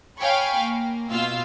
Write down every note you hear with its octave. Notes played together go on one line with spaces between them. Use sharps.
C#5 F5 G5 G#5 B5 C#6
A#3
B2 F4 F5 E6